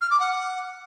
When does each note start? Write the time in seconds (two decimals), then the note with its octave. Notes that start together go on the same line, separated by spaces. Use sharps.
0.01 F6
0.10 D6
0.19 F#5